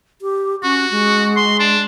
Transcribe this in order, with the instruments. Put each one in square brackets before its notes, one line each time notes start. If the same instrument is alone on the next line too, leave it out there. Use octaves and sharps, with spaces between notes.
[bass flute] G4
[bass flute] C#4 [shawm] F#4
[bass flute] G#3
[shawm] C6
D4